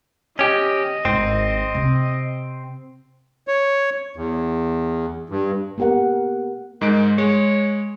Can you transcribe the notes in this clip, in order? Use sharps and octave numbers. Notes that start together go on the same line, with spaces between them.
C#4 G4 D#5
G#1 C4
C3
C#5
E2
G2
A#3 B3 G4 A#4 F#5
G#2 D#3 G#3 D7
G#3 C#5